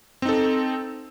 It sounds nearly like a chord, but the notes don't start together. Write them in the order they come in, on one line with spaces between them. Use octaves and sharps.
C4 D#4 A4